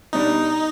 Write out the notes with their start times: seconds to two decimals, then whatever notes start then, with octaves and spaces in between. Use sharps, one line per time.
0.13 B2 G3 D4 D#4